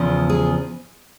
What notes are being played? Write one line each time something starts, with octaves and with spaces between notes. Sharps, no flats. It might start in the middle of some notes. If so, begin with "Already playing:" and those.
Already playing: E2 C#3 F3
G#4